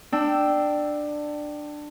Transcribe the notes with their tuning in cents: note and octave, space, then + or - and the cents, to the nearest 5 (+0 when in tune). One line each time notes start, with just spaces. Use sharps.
D4 +15 G5 -10 E6 +0